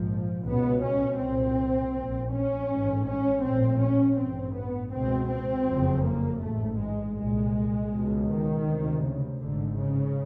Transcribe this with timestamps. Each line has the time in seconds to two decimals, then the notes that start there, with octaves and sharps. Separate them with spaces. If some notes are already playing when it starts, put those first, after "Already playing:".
Already playing: A#1 G#2 F3
0.46 C#2 B2 B3
0.82 C#4
1.20 C2 A#2 C4
1.94 A#1 A#2
2.32 C#4
2.70 A1 G#2
3.06 C#4
3.43 A#1 A2 C4
3.81 C#4
4.17 A1 G2 C4
4.55 B3
4.93 C#2 B2 C4
5.29 C4
5.66 F#1 F2 C#3
6.04 A#3
6.41 A1 G#2 A3
6.78 G#3
7.16 C2 A#2 G#3
7.91 C#2 B2
8.28 D#3
8.65 D2 C3
9.02 C#3
9.40 G#1 G#2 D3
9.76 C#3